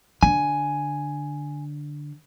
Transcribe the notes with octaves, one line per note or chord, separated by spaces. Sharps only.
D3 G#5